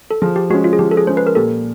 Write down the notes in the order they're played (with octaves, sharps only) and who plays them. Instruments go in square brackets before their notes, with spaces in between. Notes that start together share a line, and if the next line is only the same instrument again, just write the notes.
[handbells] A4
[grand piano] F3 [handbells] G#4
[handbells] G4
[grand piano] G#3 C#4 [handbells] F#4
[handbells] F4
G#4
[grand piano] F3 [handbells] G4
[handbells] A4
G#4
[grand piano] G#3 C#4 [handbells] C5
[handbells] B4
A#4
[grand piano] A#2 [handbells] G4 A4